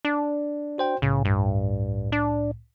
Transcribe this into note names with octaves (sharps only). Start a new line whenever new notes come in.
D4
F#4 C5 G5
C2 A2 C#3
G2
D4